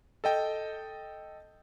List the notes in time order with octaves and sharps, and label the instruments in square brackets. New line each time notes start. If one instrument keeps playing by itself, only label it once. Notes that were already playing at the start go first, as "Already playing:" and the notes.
[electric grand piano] A4 D#5 G5